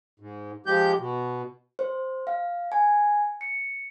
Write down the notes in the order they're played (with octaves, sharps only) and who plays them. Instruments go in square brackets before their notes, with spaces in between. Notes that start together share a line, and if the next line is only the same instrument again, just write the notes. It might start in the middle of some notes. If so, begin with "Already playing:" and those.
[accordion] G#2
F3 G#3 G4 G6
B2
[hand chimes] C5
F5
G#5
C#7